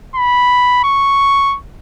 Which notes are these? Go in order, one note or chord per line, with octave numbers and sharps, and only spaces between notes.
B5
C#6